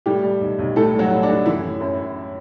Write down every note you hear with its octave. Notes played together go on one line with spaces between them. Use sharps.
A2 G3 G4
G3
B1
B1
A2 A3 A4
G3
F#3 F#4
A2
D4
A2
F#2 E3 E4
E3
F#2
F#2